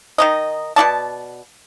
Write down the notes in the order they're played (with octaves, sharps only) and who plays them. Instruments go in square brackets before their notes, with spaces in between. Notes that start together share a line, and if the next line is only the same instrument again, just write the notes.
[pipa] D#3 D#4 D#5
B2 F4 D5 A5